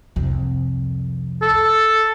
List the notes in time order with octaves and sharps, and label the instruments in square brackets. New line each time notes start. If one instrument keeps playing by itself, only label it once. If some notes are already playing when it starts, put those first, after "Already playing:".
[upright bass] C2 F2
[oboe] A4